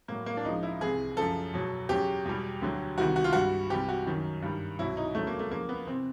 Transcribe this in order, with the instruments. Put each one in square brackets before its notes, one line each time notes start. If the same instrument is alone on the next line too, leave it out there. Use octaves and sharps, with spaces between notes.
[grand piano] A2 F#3 A#3
A#3
D4
C#2 C#3 F3 D#4
E4
C2 C3 E3 G#4
F#2 C#3 F3 A4
E2 B2 F#3
E2 C#3 F#3 G4
E2 B2 G3
D2 D3 F#3
C2 C3 D#3 G3 F#4
F#4
F4
G2 E3 G3 F#4
C2 C3 E3 G3 G4
F#4
F#2 D#3 F#3
G2 D#3 G3
C2 B2 F#3 E4
D#4
D2 C#3 F#3 A3
A#3
A3
E2 C#3 F3 A#3
B3
C3 E3 C4